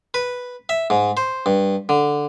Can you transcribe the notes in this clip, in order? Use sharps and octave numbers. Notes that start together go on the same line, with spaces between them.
B4
E5
G#2
C5
G2
D3